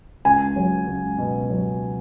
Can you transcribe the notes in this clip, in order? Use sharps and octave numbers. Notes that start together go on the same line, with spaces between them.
C#2 G#5
F#3
C#2
B2
F#3